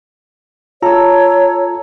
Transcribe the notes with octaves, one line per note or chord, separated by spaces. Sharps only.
F4 A4 C#5 A#5 E6